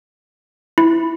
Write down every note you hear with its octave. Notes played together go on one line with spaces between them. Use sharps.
E4